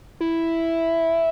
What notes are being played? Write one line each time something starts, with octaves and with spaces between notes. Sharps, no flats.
E4